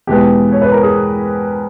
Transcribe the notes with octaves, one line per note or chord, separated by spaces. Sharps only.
E2 B2 G#3 B3 G4
C#5
B4
A#4
G#4